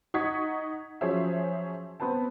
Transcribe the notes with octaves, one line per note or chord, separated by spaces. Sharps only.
D#4 F#5 C#6 D#6 G#6 B6
F3 F#3 C#4 G#4 C5 E5
B3 C4 B4 C5 A5